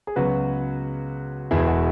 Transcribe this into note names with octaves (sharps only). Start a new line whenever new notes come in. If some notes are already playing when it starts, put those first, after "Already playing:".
G#4
C#2 C#3 F#3 B3 F#4 B4
E1 E2 B2 E4 G#4
F#4